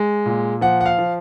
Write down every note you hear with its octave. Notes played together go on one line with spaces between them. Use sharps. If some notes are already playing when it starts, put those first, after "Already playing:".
Already playing: G#3
A#2
F3 F#5
F#5
F5
F3